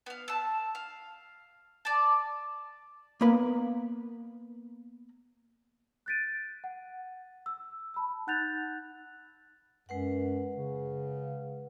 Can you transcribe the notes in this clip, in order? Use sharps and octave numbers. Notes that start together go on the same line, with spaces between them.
B3 F5
A5 E6
F5
D5 A5
A#3 B3 A#4 B4 B5
F#6 G6 A6 B6 D7 D#7
F#5
E6
A5 B5 E6
D#4 F#5 F#6 G6 A6 F7
F#2 G#3 B4 F#5
C#3